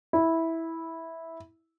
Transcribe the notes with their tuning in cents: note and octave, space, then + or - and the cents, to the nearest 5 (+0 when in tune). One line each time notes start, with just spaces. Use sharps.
E4 -10